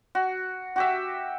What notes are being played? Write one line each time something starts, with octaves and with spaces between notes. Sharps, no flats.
F#4
F#4 G4 E5